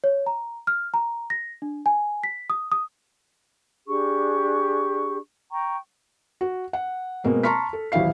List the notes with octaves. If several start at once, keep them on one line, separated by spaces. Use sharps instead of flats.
C#5
A#5
F6
A#5
A#6
D4
G#5
B6
D#6
D#6
D4 G4 G#4 C#6
G5 A#5 C#6
F#4
F#5
B2 G#3 A#3 C4
A5 A#5 C6 C#6 F6 B6
A4
D#1 A1 F#3 E4 F5 C7